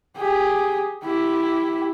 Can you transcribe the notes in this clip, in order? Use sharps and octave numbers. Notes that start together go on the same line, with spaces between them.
G4 G#4
E4 G4